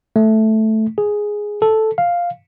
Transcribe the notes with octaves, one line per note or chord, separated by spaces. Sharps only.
A3
G#4
A4
F5